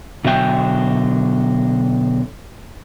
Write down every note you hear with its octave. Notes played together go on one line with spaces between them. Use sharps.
B2 D3 F#3 E5 G5 G#5